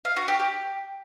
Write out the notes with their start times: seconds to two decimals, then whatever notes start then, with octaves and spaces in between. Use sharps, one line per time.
0.05 F5
0.16 F#4
0.28 G4
0.40 G4